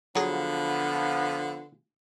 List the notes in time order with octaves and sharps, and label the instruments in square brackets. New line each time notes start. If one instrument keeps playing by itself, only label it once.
[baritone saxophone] D3 [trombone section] F3 B3 [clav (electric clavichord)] F#3 G#4